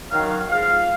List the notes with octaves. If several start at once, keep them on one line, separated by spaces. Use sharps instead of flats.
F#2 D#3 F#3 F5
G#2 F3 F5